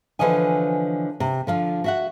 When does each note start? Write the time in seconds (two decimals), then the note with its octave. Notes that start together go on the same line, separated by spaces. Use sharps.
0.19 D3 E3 F3 C#5 D#5 G#5
1.20 C3
1.47 D3 F3 F4
1.84 F#4 E5 F#5